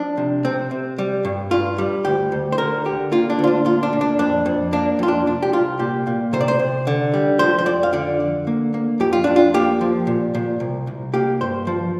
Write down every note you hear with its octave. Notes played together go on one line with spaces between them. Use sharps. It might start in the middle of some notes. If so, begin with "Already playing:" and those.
Already playing: F3 D4
C3
C3 C4
C3
G3
G2
G2 F4
G3
D2 G4
D2
C5
D3 A#4
D3 G4
A#3 F4
D4
D2 F4
D4
A#2 F4
D4
A#2
D4
F2 D4
F2
A#3 D4
F2 F4
D4
C2 D4
G4
C2 F4
A#2 G4
A#2
C3 C5
D5
C5
C3
D3
G3
F3 C5
C5
F2 D5
F5
D3 D5
D3
A#3
A#3
F2 G4
F4
F2 D4
F4
A#3 G4
F3
A#2
A#2
C2
C2
A#3 G4
G2 C5
F3